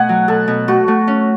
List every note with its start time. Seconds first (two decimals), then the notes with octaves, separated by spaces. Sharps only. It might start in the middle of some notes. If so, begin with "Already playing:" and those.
Already playing: B2 A3 F#5 G#5 C#6
0.09 F#3
0.28 B2 A4
0.48 B2
0.68 A3 F#4
0.88 A3
1.07 C#4